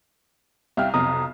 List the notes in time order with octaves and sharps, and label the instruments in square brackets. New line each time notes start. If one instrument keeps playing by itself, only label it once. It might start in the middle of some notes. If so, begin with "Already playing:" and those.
[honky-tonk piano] C2 F6 [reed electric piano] E5 F5 G5
[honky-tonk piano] B1 F2 [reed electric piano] C3 A#5 D#6